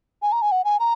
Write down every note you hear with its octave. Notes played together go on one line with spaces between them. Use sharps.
G#5
A#5
G#5
F#5
G#5
A#5